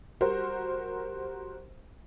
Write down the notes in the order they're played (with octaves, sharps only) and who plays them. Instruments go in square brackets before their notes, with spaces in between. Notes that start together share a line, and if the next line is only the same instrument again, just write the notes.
[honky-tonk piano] G3 F#4 A#4 C5